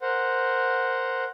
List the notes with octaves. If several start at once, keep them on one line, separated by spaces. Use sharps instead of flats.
A#4 C5 F#5